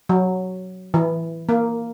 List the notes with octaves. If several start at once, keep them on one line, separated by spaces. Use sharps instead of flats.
F#3
E3
A#3